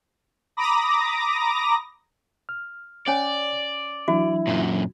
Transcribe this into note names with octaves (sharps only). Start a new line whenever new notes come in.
A#5 B5 D6 D#6 A#6
F6
C#4 C#5 D5 G#5
E3 F#3 D4 E4 F#4
F#2 A#2